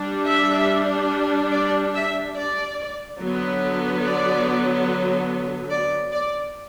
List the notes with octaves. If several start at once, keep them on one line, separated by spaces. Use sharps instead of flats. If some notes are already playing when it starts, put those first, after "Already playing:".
Already playing: G3 D4
E5
D5
E5
D5
D3 F#3 B3
D5
D5
D5